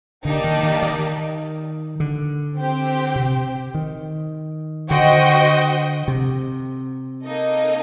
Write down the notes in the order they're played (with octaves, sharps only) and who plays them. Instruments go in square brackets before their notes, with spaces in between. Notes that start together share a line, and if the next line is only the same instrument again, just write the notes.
[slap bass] D3 [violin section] A#3 D#4 G4 D5 A5
[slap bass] D#3
D#3
D#3
D3
[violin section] C4 G4 C5 G5
[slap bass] C3
D#3
[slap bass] D3 [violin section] F#4 C5 D#5 G5
[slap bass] C3
[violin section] A#3 D#4 A4 D#5